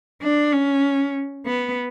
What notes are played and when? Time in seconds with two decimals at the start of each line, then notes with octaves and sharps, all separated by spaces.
0.22 D4
0.53 C#4
1.46 B3